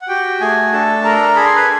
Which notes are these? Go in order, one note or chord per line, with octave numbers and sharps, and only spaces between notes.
F#5
F#4 G4 G5
A3 G#4 G#5
D4 A4 A5
A4 A#4 A#5
G#4 B5
C6
B4 B5